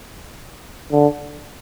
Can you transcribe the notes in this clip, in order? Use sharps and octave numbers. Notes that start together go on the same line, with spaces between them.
D3